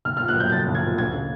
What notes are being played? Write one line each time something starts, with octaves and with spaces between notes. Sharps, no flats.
B1 F6
A#2 F6
F#6
F#3 G6
B1 A6
B1
G#6
A#2
D2 G#6
C#3